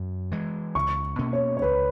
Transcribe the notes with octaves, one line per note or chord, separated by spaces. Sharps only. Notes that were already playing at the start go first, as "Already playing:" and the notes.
Already playing: F#2
E3 G#3
C#2 C#6
B2 A#3 C#4
C#5
C#5
C#2 B4